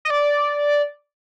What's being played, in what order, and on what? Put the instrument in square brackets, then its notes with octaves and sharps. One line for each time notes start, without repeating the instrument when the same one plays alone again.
[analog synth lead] D#5
D5